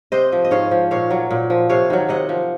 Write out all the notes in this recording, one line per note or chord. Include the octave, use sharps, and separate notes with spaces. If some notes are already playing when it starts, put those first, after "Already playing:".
C3 C5 D#5
F3
D#5
G#2 C#5 F5
F3
A#2 C#5 F5
F#3
A#2
F3
C3 C#5 F5
D#3 F#3
C3 D#5 F#5
F3